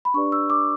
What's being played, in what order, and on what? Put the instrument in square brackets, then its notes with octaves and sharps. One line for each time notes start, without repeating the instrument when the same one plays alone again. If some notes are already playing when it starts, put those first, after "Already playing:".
[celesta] B5
D4 G4 B4 D5 C#6
E6
D6